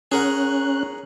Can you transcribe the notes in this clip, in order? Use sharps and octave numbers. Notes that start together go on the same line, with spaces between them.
C#4 G#4 A#4 F#5 F#6